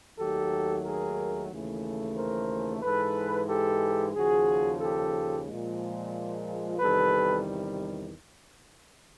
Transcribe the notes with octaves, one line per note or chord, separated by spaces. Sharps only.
D#2 D#3 F#3 A3 G4 A4
G#4 A#4
D#2 C#3 E3 A3
A#4 C5
G#2 E3 G#3 A4 B4
G4 A4
D#2 C#3 F3 F#4 G#4
G4 A4
A#2 F3 G#3
E2 C3 D#3 G3 A4 B4